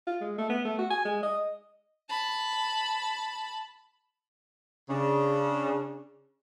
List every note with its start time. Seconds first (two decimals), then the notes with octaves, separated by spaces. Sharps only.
0.07 F4
0.21 G#3
0.38 A3
0.50 B3
0.65 A3
0.79 F#4
0.91 G#5
1.05 G#3
1.23 D#5
2.09 A5 B5
4.90 C#3 D4